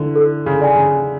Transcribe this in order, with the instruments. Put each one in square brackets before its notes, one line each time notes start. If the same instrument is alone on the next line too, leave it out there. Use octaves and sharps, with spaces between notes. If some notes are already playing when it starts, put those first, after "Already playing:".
Already playing: [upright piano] D3 E3
[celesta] A4
[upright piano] C#3
[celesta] D5 G#5
[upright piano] C#3